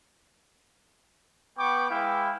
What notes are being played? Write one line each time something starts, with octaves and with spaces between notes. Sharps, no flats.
B3 G5 B5 C#6 D6
G#3 E4 B4 F5 G5